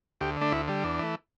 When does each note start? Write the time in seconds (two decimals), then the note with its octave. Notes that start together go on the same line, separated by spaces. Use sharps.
0.21 D2 G4
0.37 D3 A3 D4
0.52 D2 E4
0.68 D3 G3
0.84 E2 D4
1.00 E3 A3